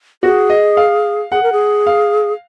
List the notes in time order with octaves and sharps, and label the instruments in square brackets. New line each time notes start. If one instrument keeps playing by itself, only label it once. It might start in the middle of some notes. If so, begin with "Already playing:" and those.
[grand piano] F#4 [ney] G#4
[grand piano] D#5
F5
[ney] G#4 [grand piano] F#5
[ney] A#4
G#4
[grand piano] F5